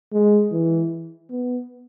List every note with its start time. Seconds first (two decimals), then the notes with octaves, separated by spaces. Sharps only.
0.13 G#3
0.52 E3
1.30 B3